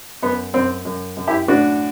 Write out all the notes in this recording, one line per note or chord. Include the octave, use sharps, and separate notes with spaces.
F#2 B3
F#2 C4
F#2
F#2
E4 G4
A2 D4 F#4